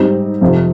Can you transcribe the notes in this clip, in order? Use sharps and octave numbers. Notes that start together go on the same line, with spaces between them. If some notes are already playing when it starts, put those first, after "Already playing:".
Already playing: G#2 G3 C4 D#4
F2 C3 F3